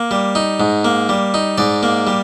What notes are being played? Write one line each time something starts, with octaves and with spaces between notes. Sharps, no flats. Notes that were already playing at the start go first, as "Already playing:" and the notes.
Already playing: A#3
G3
D#4
G#2
A#3
G3
D#4
G#2 D5
A#3
G3